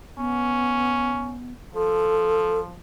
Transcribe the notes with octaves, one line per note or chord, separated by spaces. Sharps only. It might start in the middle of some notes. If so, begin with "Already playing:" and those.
B3 C#4
F3 A4